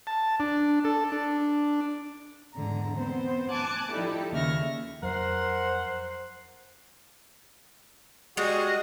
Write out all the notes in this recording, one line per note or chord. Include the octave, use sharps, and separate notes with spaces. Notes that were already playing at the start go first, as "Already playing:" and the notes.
A5
D4
A4
D4
E2 G#2 D3 A#5
B3 C4 C5
G#5 A5 D6 F#6 G#6
F3 G3 D#4 E4 G4 A4
D#2 C#3 E5 C#6 F6 A#6
F2 F#3 A#4 C5 F#5
G3 G#3 F#4 G#4 D#5